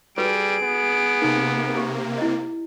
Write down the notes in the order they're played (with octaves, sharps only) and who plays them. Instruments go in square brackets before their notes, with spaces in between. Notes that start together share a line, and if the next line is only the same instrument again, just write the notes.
[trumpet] G3 [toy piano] F#4 A4 B4 [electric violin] G#4 D7
[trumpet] B3
[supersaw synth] C3 A#3 [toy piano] D#4
[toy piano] G4
E4 D#5